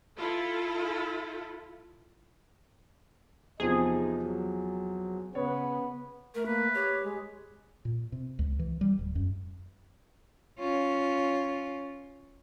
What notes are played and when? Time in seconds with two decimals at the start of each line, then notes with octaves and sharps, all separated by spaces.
0.16 E4 F4 A4
3.60 E2 C3 F3 D#4 G#4
4.22 F#3
5.35 C#3 B3 C#5
6.35 A3 A#4
6.46 A#3 B4
6.74 G4 C#5
7.03 G#3
7.85 A#2
8.12 C3
8.39 C#2
8.59 E3
8.81 G3
8.99 D1
9.15 F#2
10.59 C#4 F4